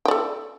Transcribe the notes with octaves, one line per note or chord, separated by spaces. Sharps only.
A4 D5 G5